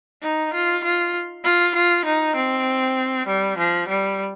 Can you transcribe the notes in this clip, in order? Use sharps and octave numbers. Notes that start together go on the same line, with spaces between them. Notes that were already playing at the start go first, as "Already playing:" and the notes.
D#4
F4
F4
F4
F4
D#4
C4
G3
F3
G3